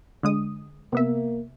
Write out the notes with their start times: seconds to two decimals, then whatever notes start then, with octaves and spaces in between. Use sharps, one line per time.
0.23 D3 G#3 D#6
0.93 C3 A#3 B3 E5